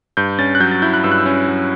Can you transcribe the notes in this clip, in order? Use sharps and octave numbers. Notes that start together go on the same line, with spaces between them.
G2 G6
C#4 A6
F#6
F#3 G6
A6
E4 G6
F#6
G2 E6
F#6
E6
C#4
F#3